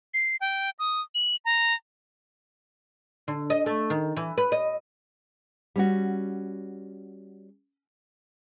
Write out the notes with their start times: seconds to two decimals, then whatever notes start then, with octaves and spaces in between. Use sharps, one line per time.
0.14 C7
0.41 G5
0.79 D#6
1.15 F#7
1.45 A#5
3.28 D3
3.50 D#5
3.66 A3
3.90 D#3
4.17 E3
4.38 B4
4.52 D#5
5.76 G3 C#4 F#4